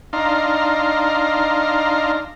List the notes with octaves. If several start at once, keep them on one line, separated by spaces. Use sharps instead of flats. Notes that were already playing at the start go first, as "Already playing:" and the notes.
D4 D#4 F5 A#5 C6